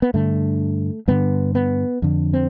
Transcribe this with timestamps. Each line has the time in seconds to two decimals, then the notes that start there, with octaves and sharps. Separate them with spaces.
0.02 B3
0.14 G2 D3 A3
1.08 G2 D3 B3
1.55 B3
2.02 F2 D3
2.33 C4